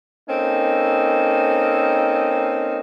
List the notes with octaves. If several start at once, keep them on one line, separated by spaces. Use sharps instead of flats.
A#3 C4 C#4 D#4 A4